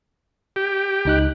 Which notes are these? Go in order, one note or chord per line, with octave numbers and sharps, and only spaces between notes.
G4
C#2 D#4 F#6